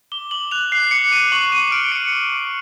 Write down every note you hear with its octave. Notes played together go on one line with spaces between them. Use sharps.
D6 G7
D6 F#7
F#6 F7
F#6 C7
D6 C#7
D6 D#7
C#6 F#7
C#6 D#7
F6 D7
F6 C#7
C#6
C#6